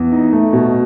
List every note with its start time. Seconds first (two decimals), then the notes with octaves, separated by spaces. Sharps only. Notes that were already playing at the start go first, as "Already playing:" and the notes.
Already playing: E2
0.12 D#4
0.33 A3
0.53 B2